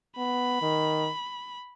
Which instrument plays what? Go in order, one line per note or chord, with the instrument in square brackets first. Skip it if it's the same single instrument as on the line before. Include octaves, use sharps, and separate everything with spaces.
[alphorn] B3 [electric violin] B5
[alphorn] D#3